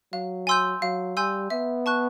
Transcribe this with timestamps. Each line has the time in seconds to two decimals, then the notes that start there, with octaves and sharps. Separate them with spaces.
0.13 F#3 F5
0.47 G#5 C6 E6 G6
0.82 F#3 F5
1.16 G3 G#5 C6 E6 G6
1.50 B3 E5
1.86 A5 C#6 F#6